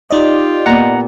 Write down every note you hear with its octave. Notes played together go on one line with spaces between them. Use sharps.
D#4 F4 G4 D5 D#5
A#2 B3 F#5 A#5